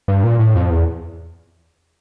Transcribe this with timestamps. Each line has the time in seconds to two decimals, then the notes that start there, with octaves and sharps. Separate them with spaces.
0.08 G2
0.24 A#2
0.39 A2
0.55 F2
0.70 E2